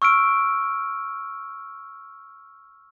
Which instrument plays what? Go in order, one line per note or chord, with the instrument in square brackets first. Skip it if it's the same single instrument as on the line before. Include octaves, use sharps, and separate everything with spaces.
[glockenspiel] C#6 E6 F6 D7